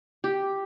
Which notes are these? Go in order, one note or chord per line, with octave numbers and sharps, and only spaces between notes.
G4